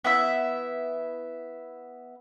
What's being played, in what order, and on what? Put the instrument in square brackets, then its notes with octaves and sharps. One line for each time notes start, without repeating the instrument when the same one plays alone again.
[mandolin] B3 E4 E5